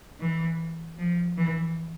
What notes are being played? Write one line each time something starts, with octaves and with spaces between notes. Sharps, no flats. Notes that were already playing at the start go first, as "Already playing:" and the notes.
E3
F3
E3